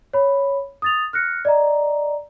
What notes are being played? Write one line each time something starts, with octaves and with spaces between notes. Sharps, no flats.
C#5 B5
D#6 A6 F7
F6 F#6 A#6 C#7
D5 D#5 A#5